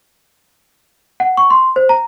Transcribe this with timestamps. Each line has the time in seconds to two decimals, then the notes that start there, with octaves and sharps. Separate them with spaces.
1.20 F#5
1.37 C#6
1.50 C6
1.76 C5
1.89 A#5